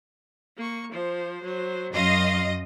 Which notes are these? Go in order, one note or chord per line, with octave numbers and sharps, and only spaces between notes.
A#3 C#6
F3 C5
F#3 C5
F#2 D#5 F5 C6